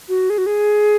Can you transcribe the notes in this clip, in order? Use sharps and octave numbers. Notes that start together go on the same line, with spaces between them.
F#4
G#4
F#4
G#4